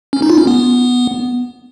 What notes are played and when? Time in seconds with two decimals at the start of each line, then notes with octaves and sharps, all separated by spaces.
0.13 C#4
0.22 D#4
0.30 F4
0.38 C#4
0.47 B3